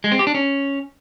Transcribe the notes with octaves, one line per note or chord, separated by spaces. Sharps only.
G#3
C4
G4
D4
C#4